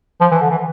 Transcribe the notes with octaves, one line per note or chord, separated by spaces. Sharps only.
F3
E3
D3
E3